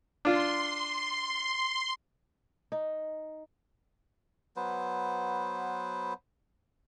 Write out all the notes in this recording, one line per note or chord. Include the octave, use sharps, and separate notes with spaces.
D4 F4 C6
D#4
F#3 B3 B4 C5